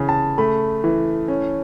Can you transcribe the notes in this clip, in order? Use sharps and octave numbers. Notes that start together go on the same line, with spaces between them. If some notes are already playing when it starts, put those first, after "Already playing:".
Already playing: C#3 E3 G#5
A5
A3 B5
E3
C#4